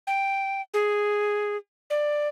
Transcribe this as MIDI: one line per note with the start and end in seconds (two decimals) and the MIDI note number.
0.07 0.61 79
0.74 1.57 68
1.90 2.28 74